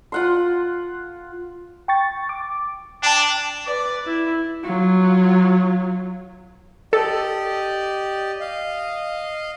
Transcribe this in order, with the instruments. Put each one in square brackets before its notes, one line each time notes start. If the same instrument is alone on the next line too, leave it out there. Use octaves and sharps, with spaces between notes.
[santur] F4 F#5 C6
[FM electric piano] G5 C#6 A6
D6
[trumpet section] D4 [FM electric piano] G5 A5
[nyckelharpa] B4 D5
E4
[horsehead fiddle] F#3 F4
[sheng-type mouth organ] G4 D5 D#5 [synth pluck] A4
[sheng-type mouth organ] D#5 F5